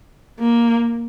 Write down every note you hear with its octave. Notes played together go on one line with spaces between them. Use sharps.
A#3